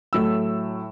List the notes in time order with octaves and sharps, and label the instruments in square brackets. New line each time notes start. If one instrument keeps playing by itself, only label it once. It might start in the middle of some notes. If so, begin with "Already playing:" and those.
[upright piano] A2 F#3 A3 E6